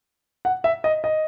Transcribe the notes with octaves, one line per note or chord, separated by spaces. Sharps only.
F#5
E5
D#5
D#5